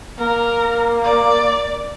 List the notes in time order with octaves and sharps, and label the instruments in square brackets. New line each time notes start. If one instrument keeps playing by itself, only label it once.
[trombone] A#3 [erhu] A#4
[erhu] D5